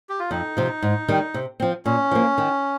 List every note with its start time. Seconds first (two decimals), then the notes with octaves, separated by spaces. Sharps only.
0.09 G4
0.19 F4
0.30 F2 D#4
0.57 C3 F3
0.82 G#2
1.08 D#3 G3
1.34 C3
1.60 F3 C4
1.85 A#2 C#4
2.11 F3 A#3
2.38 D#3